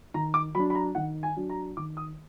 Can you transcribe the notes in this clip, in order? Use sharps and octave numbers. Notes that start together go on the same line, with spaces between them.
D#3 A#5
D6
F#3 D4 B5
B5
A#5
D#3 F#5
G#5
F#3 D4
A#5
D#3 D6
D#6